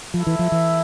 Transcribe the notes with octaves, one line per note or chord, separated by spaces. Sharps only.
F3 E4 A4 E5
E3
F3
E3